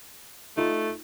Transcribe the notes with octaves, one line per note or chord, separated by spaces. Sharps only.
A3 D#4 F4